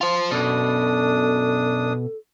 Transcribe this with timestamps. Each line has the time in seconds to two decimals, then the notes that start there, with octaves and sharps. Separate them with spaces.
0.01 F4 C5
0.31 F#2 B2 D4 A4 D#6